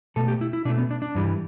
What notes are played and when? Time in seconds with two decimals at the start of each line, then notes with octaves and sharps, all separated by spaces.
0.16 B2 A3 A4
0.28 G4
0.41 E4
0.53 E4
0.65 B2 D4
0.69 A3
0.78 B3
0.91 D4
1.02 D4
1.15 G2 E3 G3